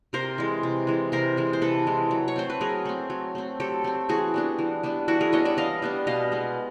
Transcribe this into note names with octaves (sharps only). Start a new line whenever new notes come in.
C3 A#4 C5
E3 G#3
C3
E3 G#3
C3 A#4 C5
E3 G#3
C5
C3 A4 B4
E3 G#3
F#3
C#5
A3 C4 C5
B4
F#3 G#4 A#4
A3 C4
F#3
A3 C4
F#3 G4 A4
A3 C4
E3 F#4 G#4
G3 B3 D4
E3
G3 B3 D4
E3 E4 F#4
G#4 A#4
G3 B3 D4 C#5 D#5
D5 E5
E3 D#5 F5
G3 B3 D4
B2 D#5 F5
G#3 B3